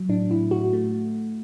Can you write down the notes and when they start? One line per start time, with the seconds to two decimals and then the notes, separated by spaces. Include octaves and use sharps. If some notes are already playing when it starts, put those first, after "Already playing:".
Already playing: F#3
0.09 A2 D4
0.30 A2 E4
0.51 A2 F#4
0.73 A3